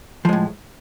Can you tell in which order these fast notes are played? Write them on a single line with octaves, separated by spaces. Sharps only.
F3 G#3 A2